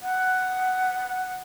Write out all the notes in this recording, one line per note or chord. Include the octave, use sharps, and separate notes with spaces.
F#5